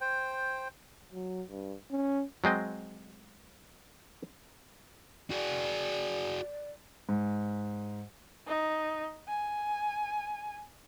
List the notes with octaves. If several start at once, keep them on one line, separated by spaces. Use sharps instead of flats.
C5 G5
F#3
G2
C#4
F#3 G#3 C4 D#5
F#4 G#4 D5
G#2
D#4
G#5